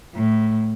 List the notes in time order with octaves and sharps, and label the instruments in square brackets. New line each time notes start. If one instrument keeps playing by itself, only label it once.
[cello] A2